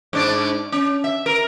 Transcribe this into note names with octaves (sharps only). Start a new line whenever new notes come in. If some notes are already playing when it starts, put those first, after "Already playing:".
G#2 D4 D5
C#4
E5
A#4